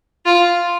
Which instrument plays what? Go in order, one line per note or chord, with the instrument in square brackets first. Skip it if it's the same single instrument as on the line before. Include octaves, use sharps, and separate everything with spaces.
[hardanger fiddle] F4